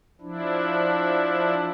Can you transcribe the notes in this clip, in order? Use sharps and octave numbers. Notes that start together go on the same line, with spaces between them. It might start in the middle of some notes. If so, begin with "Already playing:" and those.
F3 D4 E4